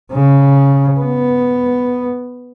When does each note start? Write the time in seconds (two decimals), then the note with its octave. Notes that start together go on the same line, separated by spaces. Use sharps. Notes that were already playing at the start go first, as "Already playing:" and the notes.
0.12 C#3
1.00 B3